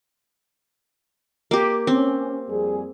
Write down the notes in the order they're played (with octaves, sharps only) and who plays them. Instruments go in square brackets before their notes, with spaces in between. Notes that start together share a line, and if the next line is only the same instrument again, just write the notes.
[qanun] A#3 G4
[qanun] C4 [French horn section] C#4
[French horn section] F2 G3 G#4